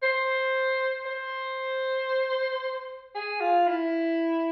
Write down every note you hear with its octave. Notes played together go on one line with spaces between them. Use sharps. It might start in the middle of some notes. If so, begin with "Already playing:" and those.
C5
C5
G#4
F4
E4